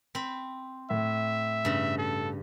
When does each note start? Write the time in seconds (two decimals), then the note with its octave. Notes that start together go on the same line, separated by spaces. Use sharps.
0.15 C4 B5
0.90 A2 E5
1.65 G2 C#3
1.98 A4